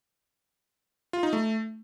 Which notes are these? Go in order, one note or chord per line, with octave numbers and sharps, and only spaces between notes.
F4
D#4
A3